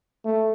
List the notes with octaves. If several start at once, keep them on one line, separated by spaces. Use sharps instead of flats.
A3